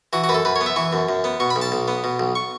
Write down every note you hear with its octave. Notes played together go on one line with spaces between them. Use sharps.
E3 F#4
F#4
F#2 B4
A4
F#2 B4
C#5
B3
E5
E3 C#6
F#2
F#2
B3
B2 C#6
B5
B1
A5
B1
B3
B2
B1
C#6